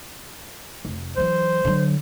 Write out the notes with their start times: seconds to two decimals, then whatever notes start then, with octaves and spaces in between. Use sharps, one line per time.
0.85 F1
1.17 E3 F#3 C5
1.65 D3 F#3